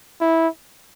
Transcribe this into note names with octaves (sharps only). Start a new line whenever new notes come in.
E4